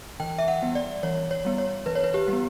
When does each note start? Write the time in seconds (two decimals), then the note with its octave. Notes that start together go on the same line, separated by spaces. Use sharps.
0.20 E3 G5
0.38 E5
0.48 F#5
0.62 G3 B3
0.75 D5
1.03 E3 C#5
1.31 C#5
1.45 G3 B3
1.58 C#5
1.86 E3 B4
1.95 C#5
2.04 B4
2.14 G4
2.28 G3 B3